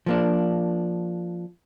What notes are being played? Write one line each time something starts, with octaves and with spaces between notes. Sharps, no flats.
F3 A#3 D4